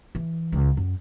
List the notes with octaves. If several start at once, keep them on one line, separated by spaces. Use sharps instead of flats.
E3
C#2
F#2